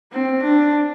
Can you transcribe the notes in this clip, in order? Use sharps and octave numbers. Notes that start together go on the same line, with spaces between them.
C4
D4